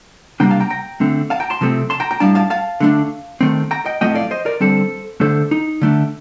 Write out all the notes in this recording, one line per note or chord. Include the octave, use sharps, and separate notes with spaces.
C3 G3 A#3 D4 G5 A#5
F5 A5
G5 A#5
G5 A#5
D3 A3 C4
F5 A5
G5 A#5
A5 C6
C3 F3 A3 C4
A5 C6
G5 A#5
G5 A#5
A2 G3 D4 F5 A5
F5 A5
F5 A5
D3 A3 D4
D#3 A3 C4
G5 A#5
D#5 G5
A2 F3 A3 C4 D#5 G5
D5 F5
C5 D#5
A#4 D5
D3 G3 C4 A4 C5
D3 A3 D4 A4 C5
D#4
D3 A3 D4